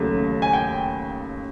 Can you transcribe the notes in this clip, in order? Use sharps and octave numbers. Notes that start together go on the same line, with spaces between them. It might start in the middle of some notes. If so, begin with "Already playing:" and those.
Already playing: D#2 C#3 F#3 A3
G#5
G5